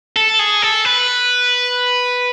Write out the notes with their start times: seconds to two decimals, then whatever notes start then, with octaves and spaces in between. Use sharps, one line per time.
0.16 A4
0.39 G#4
0.62 A4
0.85 B4